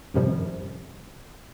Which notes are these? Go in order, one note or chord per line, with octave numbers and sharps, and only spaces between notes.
F#2 A2 C3 D#3 F3 G3